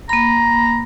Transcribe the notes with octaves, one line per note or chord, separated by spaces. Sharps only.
A#3 A#5 B5